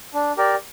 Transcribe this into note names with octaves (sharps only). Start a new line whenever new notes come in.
D4
G4 A#4 D5